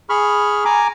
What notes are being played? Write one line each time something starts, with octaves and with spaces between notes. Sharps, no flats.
G#4 B5 C#6 F6
G#5 A#5 D6